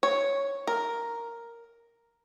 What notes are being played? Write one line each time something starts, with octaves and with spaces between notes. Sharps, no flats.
C#5
A#4